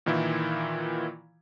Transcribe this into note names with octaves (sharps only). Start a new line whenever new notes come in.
A#2 D#3 E3 E4 F4